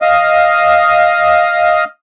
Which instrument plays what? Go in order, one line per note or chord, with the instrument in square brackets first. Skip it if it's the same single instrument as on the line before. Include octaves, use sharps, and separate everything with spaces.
[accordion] D#5 F5 D#6